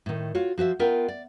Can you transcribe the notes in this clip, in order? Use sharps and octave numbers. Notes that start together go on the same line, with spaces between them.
A2 D#3
F4 F#4 C#5
F3 F#4 C5 E5
B3 F4 A#4 E5 G5
D5